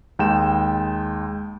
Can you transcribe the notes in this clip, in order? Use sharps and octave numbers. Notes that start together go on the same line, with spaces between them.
D#2 G#3 G5 E7